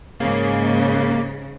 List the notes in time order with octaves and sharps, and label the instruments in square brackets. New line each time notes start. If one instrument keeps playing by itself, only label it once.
[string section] G#2 C#3 [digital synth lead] A#3